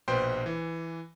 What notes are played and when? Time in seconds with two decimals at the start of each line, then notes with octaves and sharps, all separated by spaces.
0.08 A#1 B2 B4 C5 G5 C6
0.46 E3